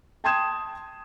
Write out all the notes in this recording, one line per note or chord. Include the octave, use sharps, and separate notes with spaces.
G5 A5 C6 D#6 G#6 E7